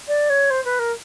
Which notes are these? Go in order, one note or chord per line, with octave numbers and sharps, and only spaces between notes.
D5
C#5
C5
B4
A#4